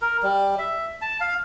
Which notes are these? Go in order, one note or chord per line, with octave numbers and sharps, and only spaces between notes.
A#4
G3
E5
A5
F5